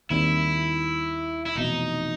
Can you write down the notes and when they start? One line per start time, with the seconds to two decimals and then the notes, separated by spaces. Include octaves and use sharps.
0.10 D#2 D#3 G3 C4 E4
1.46 E4
1.55 F1 E2 B2 D#4